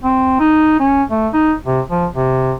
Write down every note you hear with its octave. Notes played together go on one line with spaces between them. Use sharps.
C4
D#4
C#4
A3
D#4
C3
F3
C3